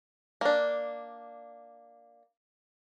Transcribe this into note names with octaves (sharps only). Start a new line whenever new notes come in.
A#3 D4